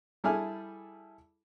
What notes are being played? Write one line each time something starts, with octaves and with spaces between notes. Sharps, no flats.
G3 E4 G#4 A4 G#5 F6